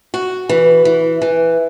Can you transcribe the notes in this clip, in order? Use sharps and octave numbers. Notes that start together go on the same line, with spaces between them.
F#4
E3
E3
E3